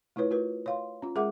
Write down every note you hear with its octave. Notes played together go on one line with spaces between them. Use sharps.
A3 E4 F4 B4 C#5
A3 F4 F#4 A#4 B4
C#5 F5 C6
C#4 F4
G#3 G#4 A#4 E5 F#5 D6